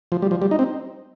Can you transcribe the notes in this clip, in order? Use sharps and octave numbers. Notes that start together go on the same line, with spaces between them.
F3
G3
F3
G3
D#4
C4